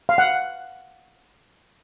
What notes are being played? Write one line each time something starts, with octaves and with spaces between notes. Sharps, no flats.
F5
F#5